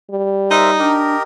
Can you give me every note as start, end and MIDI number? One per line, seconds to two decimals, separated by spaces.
0.11 0.83 55
0.51 0.95 63
0.51 0.71 70
0.51 0.71 72
0.51 0.71 76
0.79 1.15 62
0.79 1.23 67
0.79 1.23 70
0.79 1.23 75